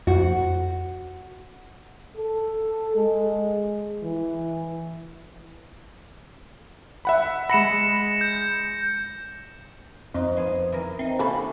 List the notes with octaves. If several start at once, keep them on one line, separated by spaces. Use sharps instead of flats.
F2 F#4
A4
G#3
E3
E5 F#5 B5
G#3 B5 A#6 C#7 E7
G6
F2 D#4 F4 C5
B3 F4 G#4
E3 A#4
C4 D#4 E5
C3 A#3 C#4 A4 G#5 B5